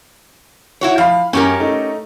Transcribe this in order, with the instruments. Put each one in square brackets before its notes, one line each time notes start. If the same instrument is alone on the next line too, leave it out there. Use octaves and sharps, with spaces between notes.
[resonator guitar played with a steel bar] E4 F#4 C#5
[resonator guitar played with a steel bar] F3 [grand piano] F5 B5
[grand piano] F#2 [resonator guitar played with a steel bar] C#4 G4 A#4
[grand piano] A3 D#4